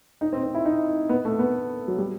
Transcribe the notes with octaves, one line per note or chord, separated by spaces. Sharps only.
D#4
C4
C4
E4
D#4
B3
A3
B3
F#3
G3